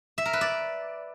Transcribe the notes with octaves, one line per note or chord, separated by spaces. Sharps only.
E5
A#4
B4
D5